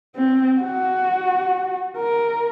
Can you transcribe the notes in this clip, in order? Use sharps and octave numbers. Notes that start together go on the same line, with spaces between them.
C4
F#4
A#4